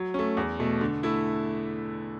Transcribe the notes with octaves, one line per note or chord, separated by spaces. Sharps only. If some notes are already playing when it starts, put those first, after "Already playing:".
Already playing: F#3
A3 C#4
E2
B2 A3
D3
A3 E4